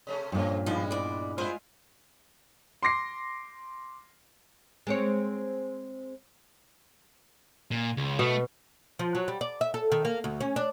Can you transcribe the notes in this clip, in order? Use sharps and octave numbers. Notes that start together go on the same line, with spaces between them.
C3 A3 C#4
G2 A#2 C#3 F3 C#4
G#2 F3 G3 G#3 B3
E2 D5
G#3 B3 E4 F4 C5 G#5
C6 D6 A#6 C7
G#3 C4 C#5
A#2
C#2
B2 A3
F3
F#3
G3
D5
E5
A4
D#3
A#3
D2
C#4
D4